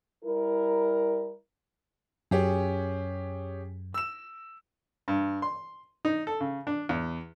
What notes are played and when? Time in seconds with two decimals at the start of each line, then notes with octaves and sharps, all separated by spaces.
0.25 G3 E4 A#4
2.31 F#2 C#4 G4 G#4
3.94 E6 E7
5.08 G2
5.42 C6
6.05 D#4
6.27 A4
6.40 C#3
6.67 D4
6.89 E2